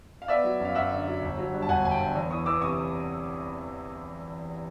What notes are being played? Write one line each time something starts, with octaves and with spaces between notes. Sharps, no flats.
F5
B3 D5 E5
F#3
F#2
F5
F#2 E5 F#5
D3
F#3
G1
F#3
G2
A5
G1 F#5 G#5
G1 G#5
G5 A5
G1
E2
E3 C#6 D#6
E3 D6 E6
C3 C#6 D#6